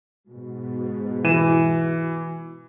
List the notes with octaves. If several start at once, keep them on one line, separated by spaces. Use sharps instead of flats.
G#2 B2
E3 D#7 E7